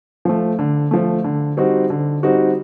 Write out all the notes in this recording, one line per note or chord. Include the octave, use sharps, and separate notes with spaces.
F3 A3
D3
F3 A3
D3
G3 C4 D#4 F#4
D3
G3 C4 D#4 F#4